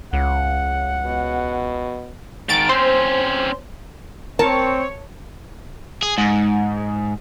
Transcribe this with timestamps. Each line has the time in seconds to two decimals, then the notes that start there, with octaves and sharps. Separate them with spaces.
0.13 C#2 F#5
1.06 B2
2.49 G#2 D#3 A6 D7
2.69 C4 C#4 C5 C6
4.39 C4 A#4 C#5 A5
6.03 G#4
6.18 G#2